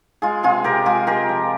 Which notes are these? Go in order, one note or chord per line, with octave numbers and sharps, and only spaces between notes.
G#3 F4 G#4
C3 F4 G#4
C3 G4 A#4
G#3 F4 G#4
G#3 G4 A#4
F3